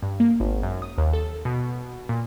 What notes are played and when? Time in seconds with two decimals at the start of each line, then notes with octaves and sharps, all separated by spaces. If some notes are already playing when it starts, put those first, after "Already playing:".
0.02 G2
0.20 A#3
0.40 G#1
0.63 F#2
0.82 D#6
0.98 D#2
1.13 A4
1.45 B2
2.09 A#2